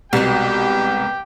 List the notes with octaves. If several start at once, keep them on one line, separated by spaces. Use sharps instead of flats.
C2 B2 G#3 G4 G5